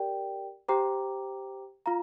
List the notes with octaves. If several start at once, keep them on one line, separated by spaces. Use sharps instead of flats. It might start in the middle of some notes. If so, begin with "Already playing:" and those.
Already playing: G4 A#4 D5 G5
G4 C5 G5 A#5 D6
F4 F5 A#5